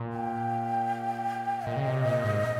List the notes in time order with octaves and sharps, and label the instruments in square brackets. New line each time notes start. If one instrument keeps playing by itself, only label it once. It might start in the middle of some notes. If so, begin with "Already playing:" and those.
Already playing: [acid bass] A#2
[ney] G5
[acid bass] A#2 [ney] D#5
[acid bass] C#3
C3
A#2
G#2